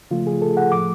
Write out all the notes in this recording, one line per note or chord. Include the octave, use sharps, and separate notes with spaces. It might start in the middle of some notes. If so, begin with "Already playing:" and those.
C#3 F3 A3 F4
G#4
A4
F#5
A2 F3 A3 D6